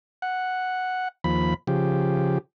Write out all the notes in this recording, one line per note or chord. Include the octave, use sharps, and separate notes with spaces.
F#5
D#2 F3 B5
C#3 F3 G4